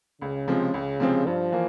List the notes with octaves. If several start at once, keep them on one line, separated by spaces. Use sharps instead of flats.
C#2 C#3
C3 F3 G#3 C4
C#2
C3 F3 G#3 C4
G2 F3
E3 A#3